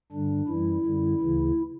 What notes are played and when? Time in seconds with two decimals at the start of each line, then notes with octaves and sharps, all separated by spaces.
0.12 G2 D3 G3 D4
0.48 F#2 E3 G3 E4
0.85 F#2 D3 G3
1.21 D2 C#3 E3